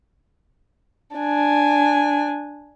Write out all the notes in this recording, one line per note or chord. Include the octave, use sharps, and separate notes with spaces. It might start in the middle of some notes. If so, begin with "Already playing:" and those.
D4 G#5